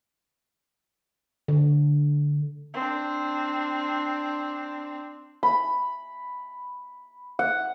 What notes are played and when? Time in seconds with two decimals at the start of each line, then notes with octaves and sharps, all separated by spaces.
1.48 D3
2.74 C4 D4
5.43 B5
7.39 F#5